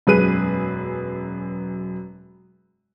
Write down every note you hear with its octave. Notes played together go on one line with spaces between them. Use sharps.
E1 F#2 G#4 B4 D#7